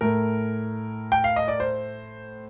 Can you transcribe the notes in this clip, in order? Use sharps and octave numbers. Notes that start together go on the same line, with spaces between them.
A2 A3 A#4
G5
F5
D#5
D5
C5